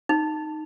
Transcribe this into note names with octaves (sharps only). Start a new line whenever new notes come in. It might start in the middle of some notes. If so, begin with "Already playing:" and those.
D#4